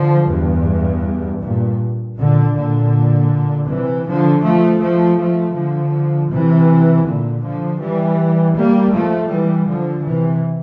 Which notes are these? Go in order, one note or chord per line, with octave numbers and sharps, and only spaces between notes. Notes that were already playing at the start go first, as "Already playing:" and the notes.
Already playing: D3 F3
E2 G2
G2 A#2
A#2 D3
A#2 D3
C3 E3
D3 F3
F3 A3
F3 A3
F3 A3
D3 F3
C3 E3
A#2 D3
D3 F3
E3 G3
G3 A#3
F3 A3
E3 G3
D3 F3
C3 E3